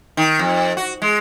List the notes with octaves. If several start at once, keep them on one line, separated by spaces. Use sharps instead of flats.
D#3
F2
F#4
G#3